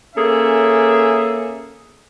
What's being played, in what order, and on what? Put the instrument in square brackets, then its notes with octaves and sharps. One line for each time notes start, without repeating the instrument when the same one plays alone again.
[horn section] A#3 C#4 G#4 A4 E5